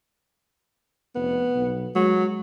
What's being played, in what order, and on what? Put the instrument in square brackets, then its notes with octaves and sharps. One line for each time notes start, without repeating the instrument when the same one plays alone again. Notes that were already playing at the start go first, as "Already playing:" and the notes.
[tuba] F1 [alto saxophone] B3
[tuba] B1
[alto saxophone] F#3 [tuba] G#3